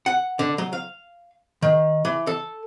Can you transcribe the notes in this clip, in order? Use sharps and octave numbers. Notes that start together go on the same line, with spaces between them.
F#5
D3
F#3
F5
D#3
E3
A4